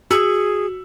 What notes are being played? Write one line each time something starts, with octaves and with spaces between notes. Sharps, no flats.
F#4 G#4 E6